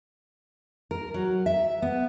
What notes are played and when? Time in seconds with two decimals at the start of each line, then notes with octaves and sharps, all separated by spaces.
0.91 A#4
1.14 F#3
1.46 E5
1.82 B3